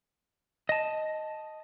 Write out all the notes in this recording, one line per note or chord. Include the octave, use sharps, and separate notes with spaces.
D#5 A5